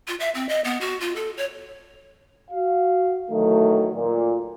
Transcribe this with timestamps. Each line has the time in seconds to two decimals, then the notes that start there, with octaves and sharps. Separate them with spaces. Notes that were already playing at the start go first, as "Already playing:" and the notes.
0.08 F4
0.20 E5
0.35 C4
0.49 D#5
0.64 B3
0.81 F#4
1.00 F4
1.16 A4
1.37 C#5
2.50 F#4 F5
3.30 D#3 E3 F#3 A3
3.96 A#2